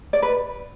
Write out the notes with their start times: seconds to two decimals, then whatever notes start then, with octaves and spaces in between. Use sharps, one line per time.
0.13 D5
0.22 B4